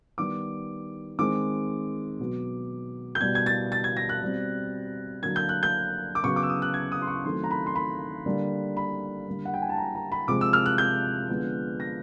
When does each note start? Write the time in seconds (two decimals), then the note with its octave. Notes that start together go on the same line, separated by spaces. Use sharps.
0.18 D#3 G3 B3 D6
1.19 D#3 G#3 C4 D6
2.19 B2 F#3 B3
3.15 G6
3.21 B2 G3 B3 G#6
3.35 G#6
3.46 A6
3.72 A6
3.84 G#6
3.97 A#6
4.09 F#6
4.22 B2 G3 C4
5.23 D3 F#3 A#3 G#6
5.36 G6
5.49 F#6
5.63 G6
6.15 D6
6.23 C#3 F#3 B3 C#6
6.36 D6
6.43 E6
6.49 D#6
6.62 F#6
6.74 G#6
6.92 D#6
7.02 C6
7.07 C#6
7.25 D#3 F#3 A3 C4 C6
7.44 A#5
7.51 B5
7.66 C6
7.76 B5
8.26 D3 G3 A#3
8.77 B5
9.27 D3 G3 A#3
9.45 F#5
9.54 G5
9.62 G#5
9.69 A5
9.78 A#5
9.95 A#5
10.12 B5
10.28 C3 F3 G#3 C4 D6
10.41 E6
10.53 F6
10.66 F#6
10.78 G6
11.29 D3 F3 G#3 B3
11.80 A#6